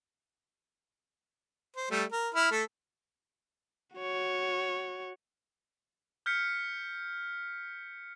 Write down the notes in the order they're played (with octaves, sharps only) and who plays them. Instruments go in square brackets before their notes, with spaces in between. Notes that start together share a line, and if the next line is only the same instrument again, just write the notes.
[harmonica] C5
G3 A3
A#4
E4 B5 F6
A3 A4
[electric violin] F#4 C#5
[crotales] F6 G6 B6 C#7